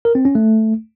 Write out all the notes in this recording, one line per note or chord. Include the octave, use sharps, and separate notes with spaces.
A#4
C4
C#4
A3